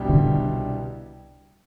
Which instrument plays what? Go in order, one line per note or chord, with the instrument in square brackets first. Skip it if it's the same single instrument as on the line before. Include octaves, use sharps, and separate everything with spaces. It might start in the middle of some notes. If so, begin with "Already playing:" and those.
Already playing: [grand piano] C2 B2 G3 D4 G4
[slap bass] D3